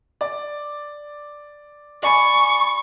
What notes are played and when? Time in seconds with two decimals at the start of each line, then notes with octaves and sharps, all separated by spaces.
0.21 D5
2.03 D5 G#5 B5 C#6